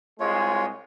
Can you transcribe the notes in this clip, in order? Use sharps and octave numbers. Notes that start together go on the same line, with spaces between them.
C2 G#3 F4 C#5